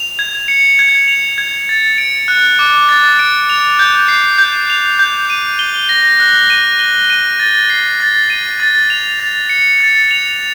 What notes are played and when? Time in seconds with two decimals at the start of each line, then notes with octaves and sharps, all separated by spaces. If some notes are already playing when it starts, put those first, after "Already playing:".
Already playing: F7
0.19 G#6
0.48 C#7
0.79 G#6
1.08 F7
1.38 G#6
1.69 A6
1.98 D7
2.28 F#6
2.59 D6
2.89 A6
3.19 D7
3.49 F7
3.79 G6
4.08 C7
4.38 G6
4.70 F7
4.99 G6
5.30 D#7
5.59 G7
5.89 A#6
6.20 F#6
6.50 D#7
6.79 G7
7.10 D#7
7.40 A6
7.70 C7
8.00 A6
8.30 D#7
8.60 A6
8.90 F7
9.20 A6
9.49 C#7
9.80 A6
10.11 F7